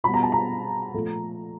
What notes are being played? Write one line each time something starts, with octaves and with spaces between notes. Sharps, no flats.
B2 G3 B3 B5
A#5
A5
A#5
A#2 F3 A3